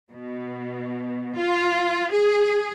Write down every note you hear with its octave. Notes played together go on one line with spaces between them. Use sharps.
B2
F4
G#4